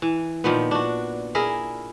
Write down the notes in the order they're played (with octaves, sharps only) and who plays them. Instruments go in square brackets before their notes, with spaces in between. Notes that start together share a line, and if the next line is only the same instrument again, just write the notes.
[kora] E3
A#2 D#3 F3 B3
D4 F#4
E4 G#4 A#4